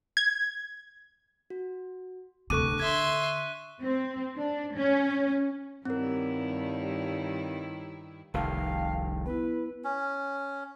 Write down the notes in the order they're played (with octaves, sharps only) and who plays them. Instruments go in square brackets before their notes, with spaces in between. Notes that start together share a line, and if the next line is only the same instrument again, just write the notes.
[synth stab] G#6
[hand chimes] F#4
[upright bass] D1 C3 [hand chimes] A4 D6 [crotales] C#6 F#6 D#7
[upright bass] D3 [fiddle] E5 C6 [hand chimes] G#6
[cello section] C4
D4
C#4
[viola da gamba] G2 D#3 E4 [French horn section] G3 D#4 C#5 [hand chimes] C4 A#4
[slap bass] F1 C2 D#3 [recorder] F5 [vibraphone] G5 A5
[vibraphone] B3 E4 [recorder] B4
[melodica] C#4